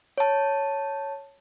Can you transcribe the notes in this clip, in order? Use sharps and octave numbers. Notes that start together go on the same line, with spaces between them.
C#5 A5